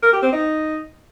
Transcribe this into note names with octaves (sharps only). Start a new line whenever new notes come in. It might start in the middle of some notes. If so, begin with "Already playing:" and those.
A#4
G4
C4
D#4